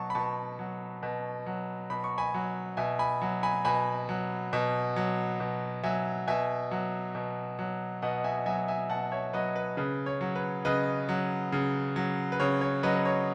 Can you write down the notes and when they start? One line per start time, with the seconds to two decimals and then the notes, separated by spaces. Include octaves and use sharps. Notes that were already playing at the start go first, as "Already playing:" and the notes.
Already playing: B2 F#3 A5 C#6
0.10 B5
0.15 B2 A5 C#6
0.59 F#3
1.03 B2
1.46 F#3
1.90 B2 B5
2.04 C#6
2.18 G#5 B5
2.34 F#3
2.77 B2 E5 G#5
2.99 G#5 B5
3.22 F#3
3.43 G#5 B5
3.65 B2 G#5 B5
4.09 F#3
4.53 B2
4.96 F#3
5.40 B2
5.83 F#3 E5 G#5
6.27 B2 E5 G#5
6.71 F#3
7.15 B2
7.59 F#3
8.02 B2 D#5 F#5
8.24 E5 G#5
8.46 F#3 E5 G#5
8.68 E5 G#5
8.89 B2 F#5 A5
9.12 C#5 E5
9.33 F#3 B4 D#5
9.56 B4
9.77 C#3 B4
10.06 C#5
10.21 F#3
10.35 B4
10.65 C#3 B4 D#5
11.09 F#3
11.52 C#3
11.96 F#3
12.32 B4
12.40 C#3 C#5
12.61 C#5
12.83 F#3 B4 D#5
12.96 B4
13.05 C#5